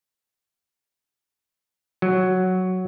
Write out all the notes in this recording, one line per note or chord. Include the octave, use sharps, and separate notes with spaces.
F#3